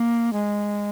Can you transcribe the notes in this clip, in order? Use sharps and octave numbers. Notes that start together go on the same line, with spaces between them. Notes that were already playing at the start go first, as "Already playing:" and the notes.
Already playing: A#3
G#3